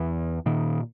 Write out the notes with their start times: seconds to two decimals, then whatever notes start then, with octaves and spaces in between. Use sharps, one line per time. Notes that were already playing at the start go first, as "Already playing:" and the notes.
Already playing: E2 E3
0.46 A#2 D#3